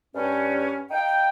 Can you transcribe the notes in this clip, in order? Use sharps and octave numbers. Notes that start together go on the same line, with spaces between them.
G2 C#4
D#4 F5 G5